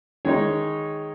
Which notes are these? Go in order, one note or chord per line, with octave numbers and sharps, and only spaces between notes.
D#3 G#3 D#4 G#4 C#5